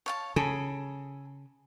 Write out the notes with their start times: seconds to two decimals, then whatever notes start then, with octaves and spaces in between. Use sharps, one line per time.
0.06 C#5 F5 A5
0.36 C#3 G#4 A4 B5